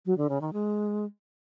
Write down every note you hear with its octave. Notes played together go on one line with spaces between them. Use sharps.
F#3
D3
C#3
D#3
G#3